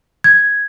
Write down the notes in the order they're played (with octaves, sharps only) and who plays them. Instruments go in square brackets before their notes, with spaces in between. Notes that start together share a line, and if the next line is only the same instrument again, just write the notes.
[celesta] G#6